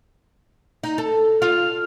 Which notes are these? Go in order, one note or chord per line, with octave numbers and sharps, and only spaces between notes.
D#4
A4
F4 F6